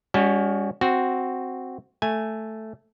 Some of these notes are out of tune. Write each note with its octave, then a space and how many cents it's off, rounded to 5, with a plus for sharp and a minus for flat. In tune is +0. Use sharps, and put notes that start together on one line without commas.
G3 +45 C#4 +25 F#4 +0
C4 +0 F#4 +0
A3 +0 G#5 +0